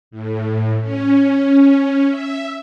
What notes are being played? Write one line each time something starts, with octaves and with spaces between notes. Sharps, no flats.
A2
C#4
E5